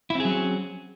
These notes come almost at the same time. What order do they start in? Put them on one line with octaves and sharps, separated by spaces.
E4 C4 G#4 F#3 C#4